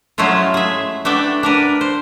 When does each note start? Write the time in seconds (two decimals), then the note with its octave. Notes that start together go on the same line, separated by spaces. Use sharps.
0.18 F#3 G#3 A3 C#4 E4 F4
0.54 G#4 E5
1.05 A3 B3 D4 D5 E5 G5
1.43 D4 A#4 B4
1.81 C5